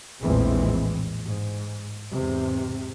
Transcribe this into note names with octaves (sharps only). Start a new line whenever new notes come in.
A#1 E2 A2 E3 G#3 C4
G#2
E2 G#2 C3